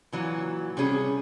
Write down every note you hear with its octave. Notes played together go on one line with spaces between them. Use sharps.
A#2 E3 F#3
C3 G3 C#4 G#4